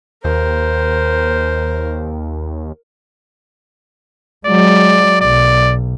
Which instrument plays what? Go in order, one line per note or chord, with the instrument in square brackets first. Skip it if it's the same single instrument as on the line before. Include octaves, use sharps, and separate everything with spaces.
[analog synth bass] D#2 [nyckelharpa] A#4 [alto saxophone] C5
[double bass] F#3 G#3 [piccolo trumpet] D5
[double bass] B1 [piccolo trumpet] D5